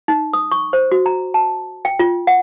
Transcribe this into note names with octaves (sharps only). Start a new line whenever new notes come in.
D#4
D#6
C#6
C5
F#4
A#5
A5
G5
F4
F#5